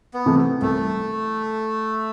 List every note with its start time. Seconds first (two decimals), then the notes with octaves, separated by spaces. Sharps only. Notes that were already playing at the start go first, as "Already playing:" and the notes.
0.14 B3
0.26 C3 E3 A3
0.62 C2 A3